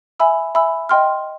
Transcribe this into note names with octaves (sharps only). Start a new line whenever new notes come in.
E5 G#5 B5 E6
E5 G#5 B5 E6
D#5 G5 C6 F6